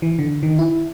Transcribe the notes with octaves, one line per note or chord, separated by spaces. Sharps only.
E3
D3
D#3
E4